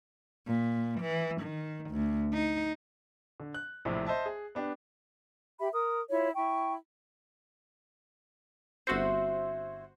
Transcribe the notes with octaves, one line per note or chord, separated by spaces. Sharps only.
A#2
E3
D#3
D2
D#4
D3
F#6
A#1 A2 C3
C5 D#5 E5 A5
G#4
B3 D4 G4
G4 E5 B5
A#4 D#6
E4 F4 C#5
E4 G5 C#6
G1 C4 E4 F#4 C5